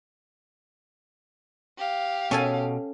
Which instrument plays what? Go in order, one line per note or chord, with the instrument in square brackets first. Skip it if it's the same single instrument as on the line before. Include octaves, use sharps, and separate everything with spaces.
[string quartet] G4 F5
[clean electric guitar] B2 [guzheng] C#4 A4 G#5